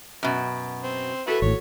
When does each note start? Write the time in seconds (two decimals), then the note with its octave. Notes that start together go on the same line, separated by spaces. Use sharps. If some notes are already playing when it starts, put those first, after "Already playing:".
0.23 F#2 B2
0.84 C4
1.27 E4 F#4 A4 B4 F#5 B6
1.42 G#1 A2 C#5